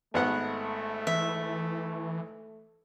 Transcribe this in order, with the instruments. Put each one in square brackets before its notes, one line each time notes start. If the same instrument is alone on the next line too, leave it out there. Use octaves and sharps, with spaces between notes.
[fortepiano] G#1 B3 F#5 [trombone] A3
[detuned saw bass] E3 [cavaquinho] E5